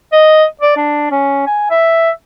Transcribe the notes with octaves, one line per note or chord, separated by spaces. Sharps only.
D#5
D5
D4
C#4
G#5
E5